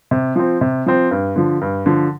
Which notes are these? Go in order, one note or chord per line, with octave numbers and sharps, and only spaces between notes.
C3
F3 C4
C3
F3 C4
G2
D3 F3
G2
D3 F3